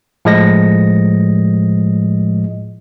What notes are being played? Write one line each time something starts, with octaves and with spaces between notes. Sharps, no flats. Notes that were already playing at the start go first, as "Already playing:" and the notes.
A2 F3 G#3 D#5 A#6